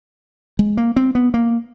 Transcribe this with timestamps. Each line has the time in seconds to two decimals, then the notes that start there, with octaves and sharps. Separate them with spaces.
0.59 G#3
0.77 A#3
0.96 C4
1.15 B3
1.34 A#3